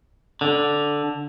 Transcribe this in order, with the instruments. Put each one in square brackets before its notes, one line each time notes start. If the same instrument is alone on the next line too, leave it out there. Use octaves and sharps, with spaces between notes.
[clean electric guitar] D3